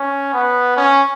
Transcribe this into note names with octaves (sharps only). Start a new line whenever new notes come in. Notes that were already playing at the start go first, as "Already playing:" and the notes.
Already playing: C#4
B3
C#4